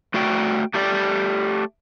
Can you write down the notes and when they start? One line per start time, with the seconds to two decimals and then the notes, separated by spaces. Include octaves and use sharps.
0.14 A3 F#4 D5 G5
0.74 A3 G4 D5